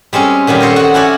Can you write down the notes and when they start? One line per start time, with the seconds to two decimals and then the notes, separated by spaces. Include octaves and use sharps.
0.13 G3 G#3 C4 C#4
0.47 A#2 D#3 F#3 G3
0.60 A4 C5 C#5 D#5
0.76 F#4 F#5
0.94 C#4 E4 F#4 D5